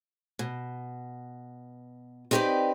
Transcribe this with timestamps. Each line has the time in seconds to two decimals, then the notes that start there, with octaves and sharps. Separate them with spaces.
0.39 B2
2.31 C4 D#4 G4 A#4 B4 D5